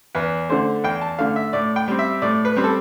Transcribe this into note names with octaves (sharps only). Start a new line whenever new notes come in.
E2 B4
D3 A3 C5
E2 G5
A5
D3 A3 F5
E5
A2 D5
G5
G3 C4
E5
A2 D5
B4
G3 C4
A4